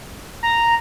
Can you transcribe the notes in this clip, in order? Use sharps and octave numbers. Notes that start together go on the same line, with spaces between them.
A#5